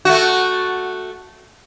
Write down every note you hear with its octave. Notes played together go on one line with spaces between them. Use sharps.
A3 F#4